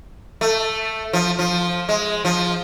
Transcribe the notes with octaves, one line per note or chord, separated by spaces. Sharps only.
A3
F3
F3
G#3
F3